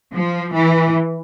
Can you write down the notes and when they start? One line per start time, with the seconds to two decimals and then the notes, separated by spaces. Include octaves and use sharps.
0.13 F3
0.54 E3